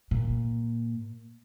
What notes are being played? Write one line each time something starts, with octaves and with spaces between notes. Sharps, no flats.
A#2